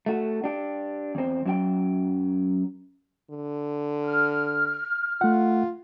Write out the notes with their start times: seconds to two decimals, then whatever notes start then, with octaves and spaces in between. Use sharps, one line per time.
0.06 A3 F#4
0.44 D4 G4
1.15 E2 C4
1.45 F#2 F#3 G5
3.31 D3
4.05 F6
5.21 A3 F4 F#5